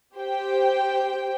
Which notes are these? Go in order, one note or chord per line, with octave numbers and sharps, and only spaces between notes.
G4 C5 G5